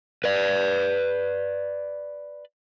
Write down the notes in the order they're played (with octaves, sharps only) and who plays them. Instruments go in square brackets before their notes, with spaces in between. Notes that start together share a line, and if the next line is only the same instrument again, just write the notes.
[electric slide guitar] B4 D5